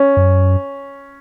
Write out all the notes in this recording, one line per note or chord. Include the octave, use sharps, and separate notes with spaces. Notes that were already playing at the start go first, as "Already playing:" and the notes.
Already playing: C#4
F#2